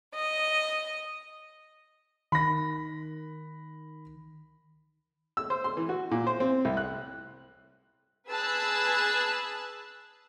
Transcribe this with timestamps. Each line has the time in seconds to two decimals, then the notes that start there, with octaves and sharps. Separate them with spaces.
0.14 D#5
2.32 D#3 B5 A#6
5.37 E6
5.50 C5
5.64 C6
5.77 E3
5.89 F#4
6.11 A#2
6.27 C5
6.40 C4
6.65 C2
6.77 F#6
8.29 G#4 B4 A5 E6 F#6 G#6